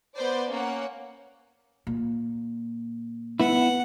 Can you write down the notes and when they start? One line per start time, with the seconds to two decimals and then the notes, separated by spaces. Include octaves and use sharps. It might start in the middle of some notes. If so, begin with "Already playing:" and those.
0.16 B3 C5 D5
0.50 A#3 C#4 F#5
1.87 A#2
3.40 B3 E4 F#5